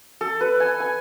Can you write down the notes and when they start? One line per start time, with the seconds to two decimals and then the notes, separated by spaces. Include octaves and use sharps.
0.21 A4
0.41 B4
0.60 G#5
0.80 G#5